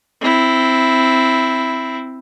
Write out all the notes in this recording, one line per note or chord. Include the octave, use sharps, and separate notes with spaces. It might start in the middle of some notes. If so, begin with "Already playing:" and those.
C4 E4